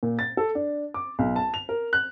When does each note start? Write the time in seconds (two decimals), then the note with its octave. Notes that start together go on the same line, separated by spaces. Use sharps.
0.03 A#2
0.19 A6
0.37 A4
0.55 D4
0.94 D6
1.19 B1
1.36 A5
1.54 F7
1.69 A#4
1.93 F#6